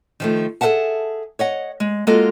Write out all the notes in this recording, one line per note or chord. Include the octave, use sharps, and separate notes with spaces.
D#3 F3 A3
G#4 A4 B4 E5 F#5 A5
C#5 D#5 F#5
G#3
G#3 A#3 F4 F#4 A4 D#5